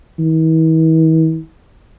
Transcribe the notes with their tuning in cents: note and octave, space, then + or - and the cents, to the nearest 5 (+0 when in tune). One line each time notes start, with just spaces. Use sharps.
E3 -45